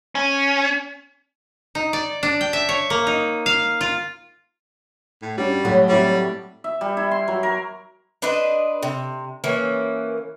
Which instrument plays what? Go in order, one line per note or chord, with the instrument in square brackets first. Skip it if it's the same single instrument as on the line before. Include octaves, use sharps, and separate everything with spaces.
[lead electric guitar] C#4
[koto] D#4
D5
D4
G5
E5
C#5
A#3
D#4
F5
F4
[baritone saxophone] A2
[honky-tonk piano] G2 C#4 F#4 [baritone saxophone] G3
[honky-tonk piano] A2 B6 [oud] F#3
[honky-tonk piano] A2 C4 E4 [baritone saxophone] G3
[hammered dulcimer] E5
G3
E4
C6
F#3
A#4
[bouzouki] D4 B4 C5 D#5
C3
E3 A#3 C#4